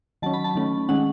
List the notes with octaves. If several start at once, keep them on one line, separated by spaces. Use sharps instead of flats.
D#3 F#3 C#4 A5
B5
A5
D#3 A3 C#4
D#3 G#3 C#4 F#5